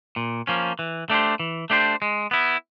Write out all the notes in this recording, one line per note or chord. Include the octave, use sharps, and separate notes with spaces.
A#2
F3 A#3 C#4
E3
A3 D4 G4 C5
E3
A3 D4 G4 C5
G#3
B3 E4